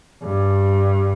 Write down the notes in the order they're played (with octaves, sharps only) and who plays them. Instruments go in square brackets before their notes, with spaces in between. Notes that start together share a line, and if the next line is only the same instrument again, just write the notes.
[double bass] G2